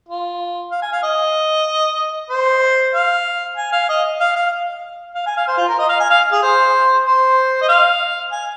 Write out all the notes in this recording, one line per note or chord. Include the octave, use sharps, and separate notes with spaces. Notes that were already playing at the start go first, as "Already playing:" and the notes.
F4
F5
G#5
F5
D#5
C5
F5
G#5
F5
D#5
F5
F5
F5
G#5
F5
C5
F4
A#4
D#5
F5
G#5
F5
G#4
C5
C5
D#5
F5
G#5